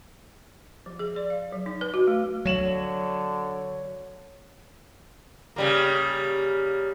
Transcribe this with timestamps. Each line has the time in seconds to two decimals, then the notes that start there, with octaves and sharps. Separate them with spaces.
0.86 F3
0.99 G#4
1.16 D5
1.30 F5
1.52 F#3
1.66 D#4
1.81 B4
1.94 F#4
2.08 A3
2.45 D3 F#3 C#5 E7 F#7
5.56 C#3 G3 A#3